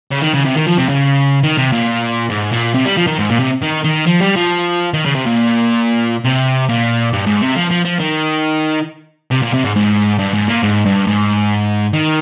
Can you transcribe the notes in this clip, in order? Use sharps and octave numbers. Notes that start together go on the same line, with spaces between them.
C#3
D#3
C#3
C3
D#3
F3
C3
C#3
D#3
C3
A#2
G#2
A#2
C3
G3
F3
D#3
G#2
A#2
C3
D#3
D#3
F3
G3
F3
D#3
C#3
C3
A#2
C3
A#2
G2
G#2
C3
F3
F3
F3
D#3
C3
A#2
C3
G#2
G#2
G2
G#2
A#2
G#2
G2
G#2
D#3